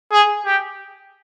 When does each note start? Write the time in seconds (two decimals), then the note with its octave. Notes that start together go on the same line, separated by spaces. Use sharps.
0.12 G#4
0.46 G4